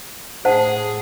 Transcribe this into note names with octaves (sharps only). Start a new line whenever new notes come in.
A2 G#4 C5 F#5 A5